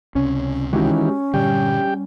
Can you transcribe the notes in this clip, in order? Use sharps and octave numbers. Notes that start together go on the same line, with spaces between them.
C#2 C3 C#4
D#3 E3 G#3 C#4 F#4 G4
G2 A#2 D3 G3 G4 G5